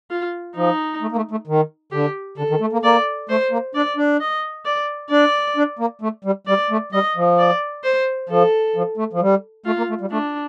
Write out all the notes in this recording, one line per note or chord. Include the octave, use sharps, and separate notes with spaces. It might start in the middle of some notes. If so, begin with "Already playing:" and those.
F4
F3 D#4
A3
A#3
A3
A3
D#3
D3 G4
D3 A4
D#3
A3
A#3
A#3 D5
A3 C5
A#3
D4 D5
D4
D#5
D5
D4 D5
D4
A#3
A3
G3
G3 D5
A3
G3 D#5
F3
D5
C5
F3 A4
F3
A3
F3
G3
A3 F4
A#3
A3
G3
A3 D4